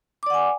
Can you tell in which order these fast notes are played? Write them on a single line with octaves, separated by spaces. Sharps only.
D6 D5 F#5 G#5